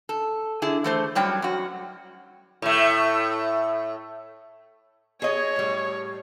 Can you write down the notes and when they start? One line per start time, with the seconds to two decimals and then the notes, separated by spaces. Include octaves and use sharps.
0.09 A4
0.62 D3 E4 G#4
0.84 E3 A3 C5
1.15 F#2 F#3 G3 C#5 G5
1.42 F#2 F#4
2.62 A2 A3
5.22 G#4 C#5 D#5
5.56 A2 G3